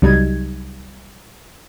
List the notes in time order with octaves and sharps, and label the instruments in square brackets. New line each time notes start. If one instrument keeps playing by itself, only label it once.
[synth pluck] C2 F#3 G3 D#4 G#6